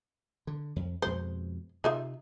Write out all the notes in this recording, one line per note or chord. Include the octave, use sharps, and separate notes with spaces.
D3
F2
F2 B2 G#3 C5
C3 D#4 F4 E5